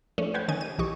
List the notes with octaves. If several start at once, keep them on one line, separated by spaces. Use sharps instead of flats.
F3 A3 C#4 D4
B4 C5 F#5 G5 B5 G#6
D#3 C#4 D#5 G#5 G#6 D#7
G4 D#7
B1 E3 G4 D#5 C#6